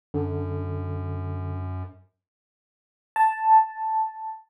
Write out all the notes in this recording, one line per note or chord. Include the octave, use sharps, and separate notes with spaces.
F#2 D3
A5